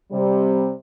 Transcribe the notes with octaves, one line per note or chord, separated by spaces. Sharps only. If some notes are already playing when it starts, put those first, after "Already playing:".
C3 G3